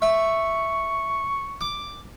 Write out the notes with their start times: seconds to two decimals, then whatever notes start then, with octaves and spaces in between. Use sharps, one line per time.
0.02 E5 C#6
1.61 D6